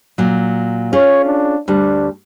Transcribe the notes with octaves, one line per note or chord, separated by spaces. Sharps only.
A#2 F#3
C#4 F4 G#4 C#5
D4
D2 G3 D4